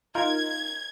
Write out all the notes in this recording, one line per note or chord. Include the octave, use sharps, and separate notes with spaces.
D#4 F4 A#4 G#6